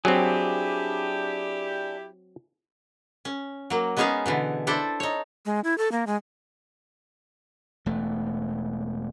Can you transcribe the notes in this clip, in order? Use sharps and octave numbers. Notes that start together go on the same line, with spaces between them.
F#3 C4 D4 E4 G4 G#4
C#4
F#3 A#3
G#3 B3 C#4 D#4 G#4 F5
B2 D3 E3
D4 E4 A4 C5 D5
D#4 C#5
G#3
E4
A4
A#3
G#3
E1 A3